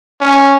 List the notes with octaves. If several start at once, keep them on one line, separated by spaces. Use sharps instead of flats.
C#4